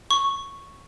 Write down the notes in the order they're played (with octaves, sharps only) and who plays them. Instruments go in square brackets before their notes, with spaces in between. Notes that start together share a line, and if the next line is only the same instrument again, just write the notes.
[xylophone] C#6